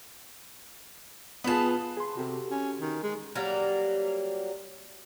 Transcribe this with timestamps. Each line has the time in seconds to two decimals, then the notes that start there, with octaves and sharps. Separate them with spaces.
1.44 B3 F4 G#4 B4 A5
1.97 G#4 C6
2.17 C3 F#4 G4 A4
2.51 C#4
2.81 D#3
3.03 G#3
3.35 F#3 G3 A#3